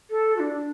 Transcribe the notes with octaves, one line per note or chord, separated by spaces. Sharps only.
A4
F#4
D4